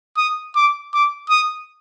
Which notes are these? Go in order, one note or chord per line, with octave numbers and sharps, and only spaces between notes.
D#6
D6
D6
D#6